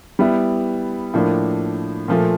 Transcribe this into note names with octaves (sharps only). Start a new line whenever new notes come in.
G3 B3 E4
A2 F3 A#3 D4
A#2 F3 A3